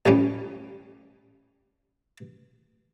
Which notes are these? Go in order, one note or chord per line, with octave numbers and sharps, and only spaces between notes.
A1 F3 G3 C#4